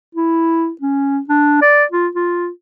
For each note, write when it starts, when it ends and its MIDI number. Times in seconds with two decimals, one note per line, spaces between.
0.15 0.70 64
0.82 1.19 61
1.29 1.59 62
1.62 1.84 74
1.92 2.08 65
2.15 2.48 65